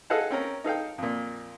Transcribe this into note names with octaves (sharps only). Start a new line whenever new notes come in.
G#4 A4 D#5 F5 F#5 A5
C4 C#4 A#4 A#5
D#4 A4 F5 G5
F2 A#2